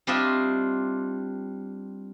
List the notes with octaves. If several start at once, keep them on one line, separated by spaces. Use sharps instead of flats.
G3 C4 D4 F4 D#5 E5